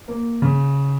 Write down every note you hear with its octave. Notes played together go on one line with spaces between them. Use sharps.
A#3
C#3